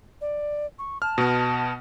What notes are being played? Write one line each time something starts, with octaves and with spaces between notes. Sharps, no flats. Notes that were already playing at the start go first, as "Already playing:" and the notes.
D5
C#6
A5 F6
B2 B3